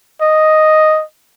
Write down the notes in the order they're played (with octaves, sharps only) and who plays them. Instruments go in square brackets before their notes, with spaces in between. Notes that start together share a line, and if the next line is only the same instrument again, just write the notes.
[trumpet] D#5